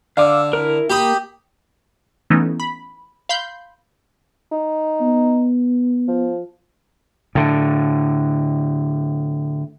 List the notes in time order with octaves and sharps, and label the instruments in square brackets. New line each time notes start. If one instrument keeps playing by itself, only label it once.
[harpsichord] D3 [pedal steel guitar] F5 D6 E6
[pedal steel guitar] E4 A#4
[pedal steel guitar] A#3 [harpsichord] G4 B5 D#6
[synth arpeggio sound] E3 A3 B3 C#4 D#4
B5
F5 B5 C6 G6
[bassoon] D#4
[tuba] B3
[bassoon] F3
[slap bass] A2 D3